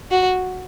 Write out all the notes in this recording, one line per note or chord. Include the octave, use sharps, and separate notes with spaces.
F#4